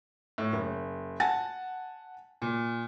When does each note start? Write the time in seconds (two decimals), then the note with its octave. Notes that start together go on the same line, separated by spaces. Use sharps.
0.38 A2
0.53 F#1
1.20 F#5 G#5 A5 A6
2.42 A#2